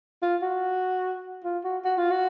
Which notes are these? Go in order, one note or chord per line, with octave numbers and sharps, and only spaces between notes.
F4
F#4
F4
F#4
F#4
F4
F#4